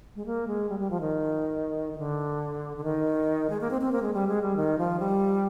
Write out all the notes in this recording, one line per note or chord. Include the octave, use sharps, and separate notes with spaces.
G#3
A#3
G#3
G3
G3
F3
D#3
D#3
D3
D3
D#3
G#3
A#3
C4
C4
A#3
G#3
G3
G#3
G3
D#3
F3
G3